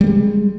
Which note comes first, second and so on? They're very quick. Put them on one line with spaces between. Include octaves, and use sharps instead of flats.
G3 A#3 G#3